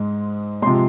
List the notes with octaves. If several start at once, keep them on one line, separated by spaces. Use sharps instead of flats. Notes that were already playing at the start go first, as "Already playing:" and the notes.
Already playing: G#2 G#3
C3 F3 G#3 C6